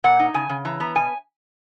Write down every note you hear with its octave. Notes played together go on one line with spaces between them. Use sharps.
A#2 F#5
D#4
C#3 G#5
C#3
E3 A#5
B3 A#5
B2 G#5